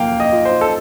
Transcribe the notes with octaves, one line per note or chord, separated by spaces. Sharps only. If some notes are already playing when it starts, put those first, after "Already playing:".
Already playing: F3 A#3 F5 G5
D#5
F4
C5
A4